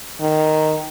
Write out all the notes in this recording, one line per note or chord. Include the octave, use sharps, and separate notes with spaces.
D#3